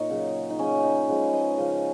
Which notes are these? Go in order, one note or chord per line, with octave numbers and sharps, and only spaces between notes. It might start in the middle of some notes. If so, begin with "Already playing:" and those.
Already playing: A#2 D#4 C#5
C#3 F#3
D#4
C#3 F#3 C#4
D#4
C#3 F3 G#3 B4
D#5
C#3 F3 G#3